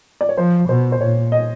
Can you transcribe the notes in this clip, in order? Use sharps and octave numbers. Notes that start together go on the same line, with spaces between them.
D5
C#5
F3 C5
B2 C5
C5
A#2 C#5
D#5